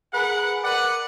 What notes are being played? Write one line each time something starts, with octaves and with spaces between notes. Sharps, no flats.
G#4 A#4 B4 F#5
A#4 B4 D5 F#5